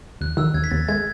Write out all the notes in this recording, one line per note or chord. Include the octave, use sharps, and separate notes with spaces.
D#2 F#6
D#3 E6
D#2 G#6
B6
D#2 A6
G#3 G#6